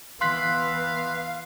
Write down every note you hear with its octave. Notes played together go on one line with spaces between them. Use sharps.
E3 B3 F5 C6 F#6 B6